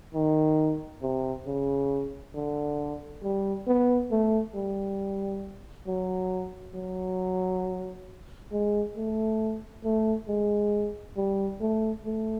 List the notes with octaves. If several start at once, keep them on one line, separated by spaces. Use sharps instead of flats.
D#3
C3
C#3
D3
G3
B3
A3
G3
F#3
F#3
G#3
A3
A3
G#3
G3
A3
A3